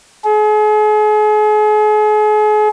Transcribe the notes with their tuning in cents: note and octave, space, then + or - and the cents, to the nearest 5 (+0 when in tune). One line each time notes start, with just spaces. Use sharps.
G#4 +40